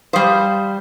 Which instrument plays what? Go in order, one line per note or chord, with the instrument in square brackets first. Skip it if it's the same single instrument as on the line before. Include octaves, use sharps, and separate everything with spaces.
[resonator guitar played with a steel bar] G3 C5 [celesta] F5 D#6 C7